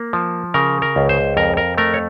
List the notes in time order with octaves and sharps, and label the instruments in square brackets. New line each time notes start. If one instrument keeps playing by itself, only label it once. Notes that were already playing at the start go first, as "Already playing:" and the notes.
Already playing: [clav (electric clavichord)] A#3
F3
C#3 A#4
A#4
C#2
C5
F2 A#4
A#4
A3 A#4
C#5